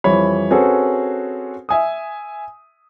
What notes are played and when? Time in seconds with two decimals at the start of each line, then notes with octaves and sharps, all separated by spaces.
0.04 F2 E3 G3 C#5 B5
0.51 C4 C#4 F#4 G#4 A4 B4
1.69 E5 G#5 D#6